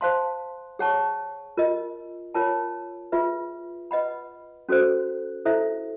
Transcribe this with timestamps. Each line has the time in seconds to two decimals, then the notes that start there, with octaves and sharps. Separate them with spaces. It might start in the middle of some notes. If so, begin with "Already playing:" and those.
0.01 C5 F5 A5 C6
0.79 G#4 C#5 F#5 A5 C#6
1.57 F4 A#4 D#5
2.34 F4 A#4 C#5 F#5 A5
3.12 F4 G#4 B4 E5
3.91 B4 D#5 F#5 B5
4.69 C#4 F#4 A4 C5
5.45 E4 A4 C5 E5